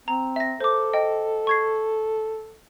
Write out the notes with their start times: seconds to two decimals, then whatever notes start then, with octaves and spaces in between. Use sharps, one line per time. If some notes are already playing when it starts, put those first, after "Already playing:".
0.08 C4 A#5
0.36 E5 A#6
0.60 A4 C5 D6
0.93 D#5 G5
1.47 C#6 G#6 C7